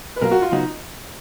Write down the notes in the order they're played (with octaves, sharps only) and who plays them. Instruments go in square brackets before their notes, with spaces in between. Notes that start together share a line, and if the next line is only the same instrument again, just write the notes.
[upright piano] B4
[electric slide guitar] B2 F#3 A#3 F4 [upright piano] A#4
[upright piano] F#4
F4
[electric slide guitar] C#3 F#3 B3 F#4 [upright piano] D#4